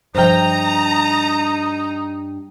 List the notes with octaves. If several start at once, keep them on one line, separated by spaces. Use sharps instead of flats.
G2 F3 D#4 C5 G5 A#5